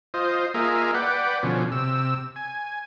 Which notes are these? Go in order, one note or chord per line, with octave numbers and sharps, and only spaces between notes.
F4 C5 D#5
A#3 F4 G#4 A#4 D#5 E5
B4 D5 F#5 G5
B2 D3 F3 C#4
C3 E6
G#5